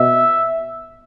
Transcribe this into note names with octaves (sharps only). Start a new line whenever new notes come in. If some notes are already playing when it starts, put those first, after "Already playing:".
Already playing: B2 E5